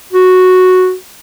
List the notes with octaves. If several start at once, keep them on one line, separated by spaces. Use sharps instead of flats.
F#4